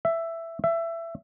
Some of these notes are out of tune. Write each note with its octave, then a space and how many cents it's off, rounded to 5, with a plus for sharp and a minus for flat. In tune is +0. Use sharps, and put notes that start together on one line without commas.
E5 +10
E5 +20